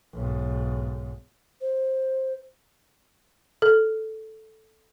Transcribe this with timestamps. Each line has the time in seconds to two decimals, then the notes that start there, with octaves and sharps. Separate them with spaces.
0.13 B1 G#2
1.61 C5
3.62 A4